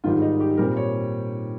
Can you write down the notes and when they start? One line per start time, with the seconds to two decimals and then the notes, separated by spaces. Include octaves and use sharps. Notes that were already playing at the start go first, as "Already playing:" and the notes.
0.04 G#2 D#3 G3 F4
0.22 D#4
0.40 G4
0.57 A#2 G3 C4 A#4
0.77 C#5